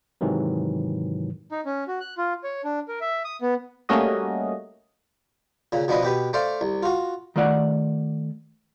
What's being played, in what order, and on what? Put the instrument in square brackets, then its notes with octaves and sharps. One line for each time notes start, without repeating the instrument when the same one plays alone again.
[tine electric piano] G#2 C3 D#3 E3 F#3
[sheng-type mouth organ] D#4
C#4
F#4
F#6
F4
C#5
D4
A#4
E5
D#6
B3
[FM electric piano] G3 A3 A#3 C#4 F#4 D#5
[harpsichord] A#2 C#3
B2 F3 D4 B4 D#5
B2 G4 B4
A3 C5 D5 F5
C2
F4 F#4
[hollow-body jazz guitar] D#3 A3 F4 D5 F#5